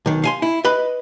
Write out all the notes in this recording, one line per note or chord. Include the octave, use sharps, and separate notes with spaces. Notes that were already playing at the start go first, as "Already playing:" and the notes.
B1 D#3
F5 G#5 C6
E4
B4 D#5 B5